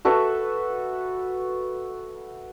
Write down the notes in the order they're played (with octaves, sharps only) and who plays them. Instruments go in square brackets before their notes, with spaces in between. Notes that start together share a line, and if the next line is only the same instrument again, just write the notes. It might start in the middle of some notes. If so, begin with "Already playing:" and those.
[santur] F#4 A4 B4 E5